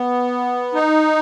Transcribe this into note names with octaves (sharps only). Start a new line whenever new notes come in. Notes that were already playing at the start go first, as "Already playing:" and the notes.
Already playing: B3
D#4